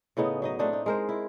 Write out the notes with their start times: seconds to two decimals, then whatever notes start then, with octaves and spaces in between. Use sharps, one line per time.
0.17 A2 C#3 B3 D#4
0.42 F#3 D#4 D#5
0.59 A3 C4 D4 D#4
0.73 D#4
0.86 G#3 A#4 C5
1.09 E4